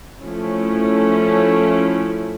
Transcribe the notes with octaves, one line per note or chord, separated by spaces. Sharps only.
F3 A3 C#4 E4